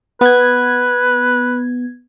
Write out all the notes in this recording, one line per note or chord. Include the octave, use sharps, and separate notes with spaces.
B3 B4 G#6